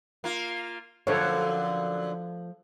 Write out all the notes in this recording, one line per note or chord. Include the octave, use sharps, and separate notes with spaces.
A#3 F4
F#2 D3 F3 A3 A4 C5 C#5